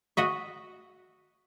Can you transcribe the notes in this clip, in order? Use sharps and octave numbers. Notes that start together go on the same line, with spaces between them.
F#4 D#5 E5